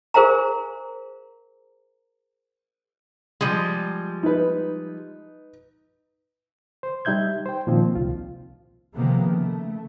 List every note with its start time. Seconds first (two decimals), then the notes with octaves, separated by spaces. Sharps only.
0.14 G#4 A#4 C5 F5 G#5 A#5
3.41 F3 G3 G#3
4.23 D#4 B4
6.83 C5
7.05 G3 D#4 E5 G6 G#6
7.46 C5 G5
7.67 A#2 D#3 F3 C4
7.95 C2 F4
8.96 C3 D#3 F3 G#3 A#3 B3
9.26 C#3 A3